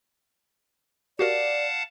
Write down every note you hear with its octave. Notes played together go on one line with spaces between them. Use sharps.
F#4 G4 A#4 D5 F5 F#5 A5